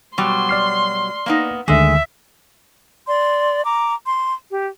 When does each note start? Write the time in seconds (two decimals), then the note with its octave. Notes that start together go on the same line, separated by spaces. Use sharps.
0.18 B2 F#3 G3 C6
0.49 D5 F6 C7
1.26 A#3 B3 D#4
1.68 D2 D3 D#3 G#3 E5
3.07 D5 C6
3.64 A#5 D6
4.05 C6
4.50 G4